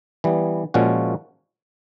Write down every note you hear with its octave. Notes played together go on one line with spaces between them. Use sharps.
E3 G3 B3
A#2 F3 G#3 C#4 F#4